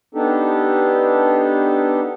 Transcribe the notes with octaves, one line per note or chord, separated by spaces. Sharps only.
B3 D4 D#4 G4 A4